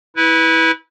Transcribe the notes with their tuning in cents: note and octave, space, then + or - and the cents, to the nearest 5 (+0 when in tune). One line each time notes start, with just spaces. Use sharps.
E4 -20 B4 +0